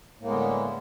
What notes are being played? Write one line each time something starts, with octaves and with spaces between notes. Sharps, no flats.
A2 D3 G#3 A#3 B3